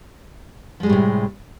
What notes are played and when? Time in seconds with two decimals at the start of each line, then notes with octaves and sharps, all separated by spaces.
0.80 F3
0.83 G#3
0.86 G3
0.89 A2
0.93 C3